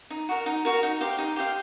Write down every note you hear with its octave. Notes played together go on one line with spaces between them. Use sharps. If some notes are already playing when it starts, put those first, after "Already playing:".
D#4
F#4 A#4
D#4
F#4 A#4
D#4
G4 C5 F5
D#4
G4 C5 F5